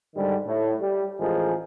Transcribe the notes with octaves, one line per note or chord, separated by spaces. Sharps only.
G#2 D3 D#3 G3
A2
G3
A1 F3 G#3 G#4 A#4